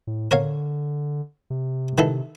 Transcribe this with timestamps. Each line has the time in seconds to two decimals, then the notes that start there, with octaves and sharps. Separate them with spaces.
0.07 A2
0.31 D3 A#4 C#5 F5
1.50 C3
1.98 D#3 E3 A4